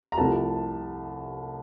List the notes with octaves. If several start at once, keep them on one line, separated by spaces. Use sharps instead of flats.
A#5
C2 C3 F3 A3 A5